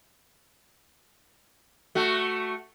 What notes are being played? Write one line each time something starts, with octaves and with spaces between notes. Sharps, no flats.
A3 F#4